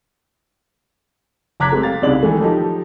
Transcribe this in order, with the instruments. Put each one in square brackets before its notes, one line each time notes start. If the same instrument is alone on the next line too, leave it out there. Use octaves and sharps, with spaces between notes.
[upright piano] F#1 A#5 D6 F#6 G#6 B6
G#3 A3 C4 G4 C5
F5 A6
C2 C#3 C4 D#4 D5 F#7
D#3 E3 G#3 A3
F3 F#3 D#4 G4 A4